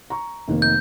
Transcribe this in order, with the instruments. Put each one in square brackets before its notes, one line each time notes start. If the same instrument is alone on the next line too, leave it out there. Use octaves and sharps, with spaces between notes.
[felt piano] A#5 C#6
F1 D#3 A#3
[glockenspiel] G6